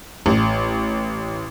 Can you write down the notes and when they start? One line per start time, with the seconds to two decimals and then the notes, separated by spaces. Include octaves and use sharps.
0.26 A1